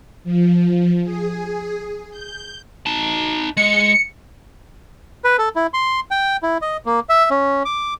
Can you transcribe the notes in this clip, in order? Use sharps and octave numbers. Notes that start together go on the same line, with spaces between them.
F3
G#4
G6
D#4 A5
G#3 C#7
B4
A4
E4
C6
G5
E4
D#5
A#3
E5
C#4
D6